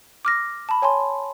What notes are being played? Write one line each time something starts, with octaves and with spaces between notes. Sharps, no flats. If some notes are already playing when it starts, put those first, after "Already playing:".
D6 F6 A#6
A5 B5
C#5 G#5 A5 C6